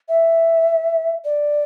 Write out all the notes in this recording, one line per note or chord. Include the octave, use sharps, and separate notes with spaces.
E5
D5